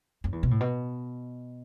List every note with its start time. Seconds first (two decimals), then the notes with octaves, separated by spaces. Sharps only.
0.24 F#2
0.32 E2
0.43 B2
0.51 A2
0.60 B2